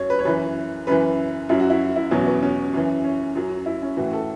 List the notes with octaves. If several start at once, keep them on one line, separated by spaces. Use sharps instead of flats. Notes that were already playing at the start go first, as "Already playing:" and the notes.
Already playing: F#2 F#3 C#5
B4
C#5
F#2 E3 B4
F#2 E3 B4
F#2 F#3 E4
F#4
E4
E4
E2 B2 F#3 C#4
B3
C#4
F#2 E3
C#4
F#2 F#3
E4
C#4
A2 E3 F#4
A4